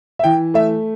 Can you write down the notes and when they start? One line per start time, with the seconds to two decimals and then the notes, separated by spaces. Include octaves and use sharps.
0.19 E5
0.24 E3 G5
0.54 A3 E5